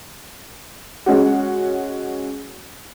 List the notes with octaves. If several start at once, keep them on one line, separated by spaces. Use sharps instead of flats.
G#3 C#4 F#4